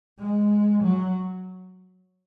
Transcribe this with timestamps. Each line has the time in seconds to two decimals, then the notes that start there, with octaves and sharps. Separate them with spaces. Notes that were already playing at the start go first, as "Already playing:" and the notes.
0.19 G#3
0.83 F#3